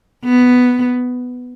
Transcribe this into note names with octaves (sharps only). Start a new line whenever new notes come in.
B3